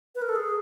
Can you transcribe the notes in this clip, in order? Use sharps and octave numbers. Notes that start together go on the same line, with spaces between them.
B4
A#4
A4
G#4